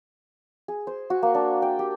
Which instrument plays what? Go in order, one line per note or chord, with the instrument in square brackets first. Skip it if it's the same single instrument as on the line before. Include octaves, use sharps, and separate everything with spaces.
[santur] G#4
C5
F#4
A#3
D4
G5
G4